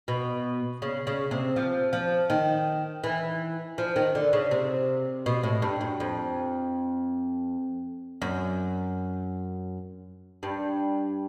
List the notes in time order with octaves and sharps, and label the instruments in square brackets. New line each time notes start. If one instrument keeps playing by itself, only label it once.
[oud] B2
C#3
C#3
C3
F3
F3
D#3
E3
F3
D#3
D3
C#3
C3
B2
A2
G2
F#2
F2
F#2
G2